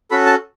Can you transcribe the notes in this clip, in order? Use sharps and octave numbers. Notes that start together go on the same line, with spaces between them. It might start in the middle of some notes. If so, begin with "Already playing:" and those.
C#4 F#4 A4 B5
A5